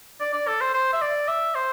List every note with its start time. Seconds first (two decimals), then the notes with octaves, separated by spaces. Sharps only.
0.20 D5
0.34 D5
0.47 A4
0.61 C5
0.74 C5
0.93 E5
1.02 D5
1.28 E5
1.55 C5